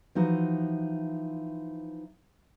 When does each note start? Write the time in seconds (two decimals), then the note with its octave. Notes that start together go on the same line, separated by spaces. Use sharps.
0.15 E3 F3 D#4 F#4